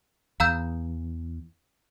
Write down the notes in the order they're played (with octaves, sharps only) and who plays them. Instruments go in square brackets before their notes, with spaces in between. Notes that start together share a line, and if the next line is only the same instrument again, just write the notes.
[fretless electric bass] E2 [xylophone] F5 A#5 E6 G6